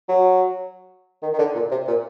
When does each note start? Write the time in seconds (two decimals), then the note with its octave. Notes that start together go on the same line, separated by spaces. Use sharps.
0.09 F#3
1.22 D#3
1.34 D#3
1.39 D3
1.55 A#2
1.71 C3
1.88 A#2